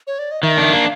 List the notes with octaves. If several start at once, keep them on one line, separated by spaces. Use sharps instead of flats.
C#5
D5
D#5
D#3 E5
D4 E5
A#3 F5